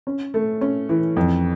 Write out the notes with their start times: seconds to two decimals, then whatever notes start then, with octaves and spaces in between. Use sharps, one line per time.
0.07 C#4
0.34 A3
0.61 C#4
0.89 E3
1.17 F2